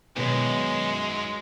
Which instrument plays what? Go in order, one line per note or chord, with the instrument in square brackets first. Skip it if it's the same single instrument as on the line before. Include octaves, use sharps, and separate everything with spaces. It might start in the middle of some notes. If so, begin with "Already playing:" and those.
[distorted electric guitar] F#2 [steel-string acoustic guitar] B2 D#3 F#3 [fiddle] G#3